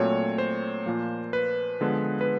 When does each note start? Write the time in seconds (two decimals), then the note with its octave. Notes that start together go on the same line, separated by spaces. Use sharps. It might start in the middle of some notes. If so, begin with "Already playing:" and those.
Already playing: A#2 F#3 A3 C4 C#5
0.38 C5
0.86 A#2 F3 A#3
1.33 B4
1.81 D3 F3 G#3 B3
2.21 B4